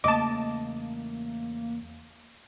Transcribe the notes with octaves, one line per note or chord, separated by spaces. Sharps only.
E2 C#3 A3 A#3 D#5 A5 D6